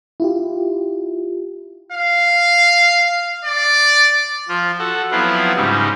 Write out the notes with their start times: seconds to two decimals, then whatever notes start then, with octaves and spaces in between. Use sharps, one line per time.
0.20 E4 F4 G4
1.92 F5
3.45 D5
4.49 F3 F4
4.79 F#4 A4
5.11 F3 F#3 B3 C4 E4 F4
5.56 G#2 C#3 G3 D#4